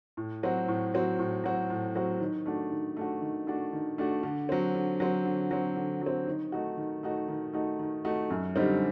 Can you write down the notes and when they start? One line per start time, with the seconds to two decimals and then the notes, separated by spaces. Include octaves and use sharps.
0.17 A2
0.43 F#3 C4 F#4
0.68 A2
0.94 F#3 C4 F#4
1.19 A2
1.44 F#3 C4 F#4
1.70 A2
1.95 F#3 C4 F#4
2.20 D#3
2.46 A3 D4 F#4
2.71 D#3
2.97 A3 D4 F#4
3.21 D#3
3.47 A3 D4 F#4
3.73 D#3
3.98 A3 D4 F#4
4.23 D3
4.49 F#3 C4
4.75 D3
5.00 F#3 C4
5.26 D3
5.51 F#3 C4
5.76 D3
6.01 F#3 C4
6.27 D#3
6.52 A3 D#4 F#4
6.77 D#3
7.03 A3 D#4 F#4
7.28 D#3
7.53 A3 D#4 F#4
7.79 D#3
8.05 A3 D#4 F#4
8.30 F#2
8.56 D3 G3 C4 D#4